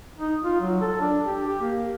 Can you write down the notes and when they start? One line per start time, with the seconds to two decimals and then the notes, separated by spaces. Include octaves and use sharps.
0.19 D#4
0.44 F4
0.60 F#3
0.81 A4
1.01 D4
1.24 G4
1.47 G4
1.62 A#3